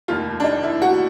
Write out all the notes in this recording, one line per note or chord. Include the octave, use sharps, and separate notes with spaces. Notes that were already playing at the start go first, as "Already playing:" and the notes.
F1 D#2 D#3 F4
D4
D#4
E4
F#4